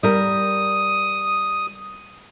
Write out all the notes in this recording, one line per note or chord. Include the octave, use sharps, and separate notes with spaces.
G3 A#4 D#6